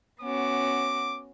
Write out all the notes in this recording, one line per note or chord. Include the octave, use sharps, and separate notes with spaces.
B3 C#4 F#4 D6